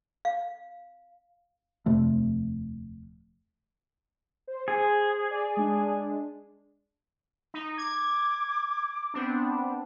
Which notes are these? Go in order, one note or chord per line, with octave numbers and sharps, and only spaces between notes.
F5
D#1 F2 C3 A3
C5
G#4
D5
G#3 D4
D#4
D6 G#6
B3 C4 D4